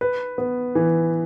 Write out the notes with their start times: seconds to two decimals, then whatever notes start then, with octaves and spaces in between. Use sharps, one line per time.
0.01 B4
0.38 B3
0.75 E3